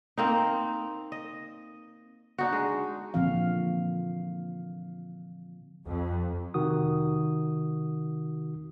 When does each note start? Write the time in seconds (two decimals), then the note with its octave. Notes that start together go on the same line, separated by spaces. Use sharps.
0.18 A#3 C4 D#4
1.12 D#5
2.38 D4 D#4 F#4
2.53 G#3
3.14 A#2 D3 E3 F3 C4 F5
5.87 F2
6.54 C3 D#3 F#4 D#6